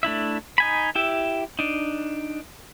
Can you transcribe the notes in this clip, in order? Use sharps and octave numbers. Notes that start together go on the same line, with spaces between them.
A3 D4 E4 E5
D#4 G#5 B5
E4 G4 E5
D4 D#4